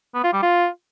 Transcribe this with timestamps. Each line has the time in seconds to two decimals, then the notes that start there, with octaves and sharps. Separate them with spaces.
0.14 B3
0.24 F4
0.33 G3
0.42 F4